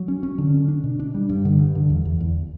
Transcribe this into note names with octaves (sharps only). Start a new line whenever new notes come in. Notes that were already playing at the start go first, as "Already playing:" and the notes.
Already playing: F#3
C#4
C#4
D3
C#4
D4
B2
D4
G3
G2
D3
G2
D3
E2
E2
E2